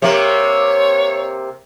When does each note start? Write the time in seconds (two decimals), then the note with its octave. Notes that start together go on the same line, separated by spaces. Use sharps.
0.02 C3 A#3 C#5